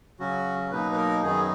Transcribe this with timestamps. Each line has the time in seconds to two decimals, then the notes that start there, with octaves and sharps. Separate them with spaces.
0.19 C#3 F#3 C#4 F#4
0.71 B2 F#3 A#3 D#4 B4
0.92 B4
0.97 A#4
1.22 F#2 D#3 F#3 B3 D#4 G#4